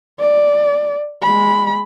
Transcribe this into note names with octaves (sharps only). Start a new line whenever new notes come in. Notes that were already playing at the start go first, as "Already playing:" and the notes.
D5
G#3 B5